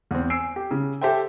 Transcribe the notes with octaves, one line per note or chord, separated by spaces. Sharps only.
E2 C4
G#5 E6 C7 D7
G4
C#3
G4 A4 C5 E5 G5